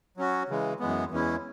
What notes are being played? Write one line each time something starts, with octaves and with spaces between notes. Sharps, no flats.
F#3 C#4 F#4
C#3 E3 G#3
F#2 E3 G#3 B3
E2 E3 G#3 C#4 E4